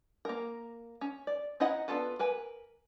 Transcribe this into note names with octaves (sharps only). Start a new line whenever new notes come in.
A#3 A#4
C#4
D5
C#4 D#4 E4 D#5 F#5
B3 D4 F4 A4 B4
A#4 B4 G#5